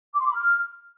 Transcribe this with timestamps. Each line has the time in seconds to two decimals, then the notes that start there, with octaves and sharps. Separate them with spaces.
0.14 D6
0.20 C6
0.25 D6
0.31 B5
0.36 F6